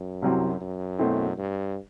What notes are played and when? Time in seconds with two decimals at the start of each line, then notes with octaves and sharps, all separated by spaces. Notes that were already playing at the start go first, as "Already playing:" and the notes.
Already playing: F#2
0.22 C2 C3 F#3 C4 E4
0.61 F#2
0.99 B2 A3 C4 E4
1.37 G2